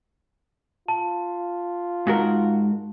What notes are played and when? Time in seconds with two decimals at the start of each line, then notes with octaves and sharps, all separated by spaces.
0.88 F4 A5
2.07 G#2 F#4 A#4